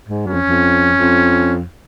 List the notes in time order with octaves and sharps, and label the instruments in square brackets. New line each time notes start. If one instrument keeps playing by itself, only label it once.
[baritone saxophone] G#2
[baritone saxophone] F#2 [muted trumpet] C#4
[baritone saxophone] F2
F2
F2